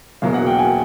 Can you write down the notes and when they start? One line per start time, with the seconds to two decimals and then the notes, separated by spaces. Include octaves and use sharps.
0.22 E1 E2 B2 F#3 A#3 F5
0.34 F#5
0.47 G5
0.59 G#5